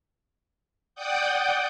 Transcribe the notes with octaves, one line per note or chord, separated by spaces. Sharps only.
D5 F#5 G5 D6 D#6 G6